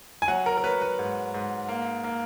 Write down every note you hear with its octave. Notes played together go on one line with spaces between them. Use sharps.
G#5
F#3 F#5
A#4
A#4
F#3 B4
B4
G#2
G#2
A#3
A#3